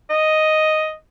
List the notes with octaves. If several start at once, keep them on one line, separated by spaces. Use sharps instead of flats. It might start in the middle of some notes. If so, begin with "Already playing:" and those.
D#5